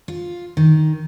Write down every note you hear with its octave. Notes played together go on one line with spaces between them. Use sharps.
F4
D#3